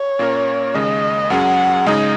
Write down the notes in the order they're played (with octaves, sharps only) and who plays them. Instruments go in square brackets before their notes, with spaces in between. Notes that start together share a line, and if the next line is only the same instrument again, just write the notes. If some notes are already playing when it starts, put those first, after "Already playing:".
Already playing: [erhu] C#5
[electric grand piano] A#2 A#3 C#4 A#4
[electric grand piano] D#2 C#3 G#3 [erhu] D#5
[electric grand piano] F#2 F#3 C#4 G#4 [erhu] F#5
[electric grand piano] C#3 G#3 D#4 G#4 [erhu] D#5